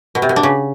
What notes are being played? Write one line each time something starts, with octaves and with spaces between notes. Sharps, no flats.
B2
C3
B2
D4
C#3